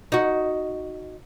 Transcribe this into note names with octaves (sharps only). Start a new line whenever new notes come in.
D#4 F#4